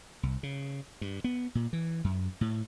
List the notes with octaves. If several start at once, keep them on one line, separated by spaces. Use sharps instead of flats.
C2
C#3
G2
B3
A#2
E3
F#2
A2